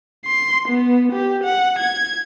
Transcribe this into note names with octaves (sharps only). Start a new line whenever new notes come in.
C6
B3
G4
F#5
G#6